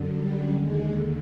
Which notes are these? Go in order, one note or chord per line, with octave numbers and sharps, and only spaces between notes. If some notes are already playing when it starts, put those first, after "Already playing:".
Already playing: F#2 D3
G3
D#2 D3 G#3